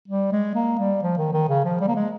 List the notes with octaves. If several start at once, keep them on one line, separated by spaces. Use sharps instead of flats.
G3
G#3
A#3
G3
F3
D#3
D#3
C#3
F3
G3
A#3
G#3